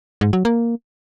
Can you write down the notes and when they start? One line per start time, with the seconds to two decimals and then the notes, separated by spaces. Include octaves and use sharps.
0.21 G#2
0.33 F#3
0.45 A#3